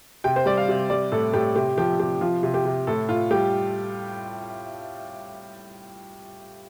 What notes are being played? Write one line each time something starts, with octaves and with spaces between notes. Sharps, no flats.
C3 G5
C5
G3 D5
F5
C3
G3 D5
A2 A4
A2 G4
C3 G4
F3 G4
C3 G4
F3 F4
C3
G4
C3
A2 A4
A2 F4
G3 G4